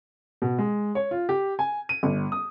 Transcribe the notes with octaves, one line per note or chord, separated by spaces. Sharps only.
B2
G#3
C#5
F4
G4
G#5
D#7
G1
D#6